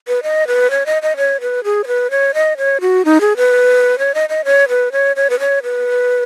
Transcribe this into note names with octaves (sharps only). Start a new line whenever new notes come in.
B4
D#5
B4
C#5
D#5
D#5
C#5
B4
G#4
C#5
B4
C#5
D#5
C#5
F#4
D#4
G#4
B4
C#5
D#5
D#5
C#5
B4
C#5
C#5
B4
C#5
B4